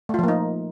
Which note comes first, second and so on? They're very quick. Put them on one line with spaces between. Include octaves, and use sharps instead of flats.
A3 F4 F3 A#3 D#4